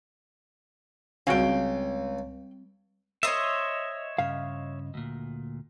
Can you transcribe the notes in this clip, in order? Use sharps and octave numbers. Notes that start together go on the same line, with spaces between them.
C#2 G3 C4 C#4 F#4 F5 G5
C5 C#5 D#5 E5
G2 C#3 F5
D2 A#2